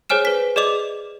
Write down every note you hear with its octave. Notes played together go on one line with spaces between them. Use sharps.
G#4 C5 C#5 G#5 F6 E7
B4 B6
G#4 D5 D#5 D6 F7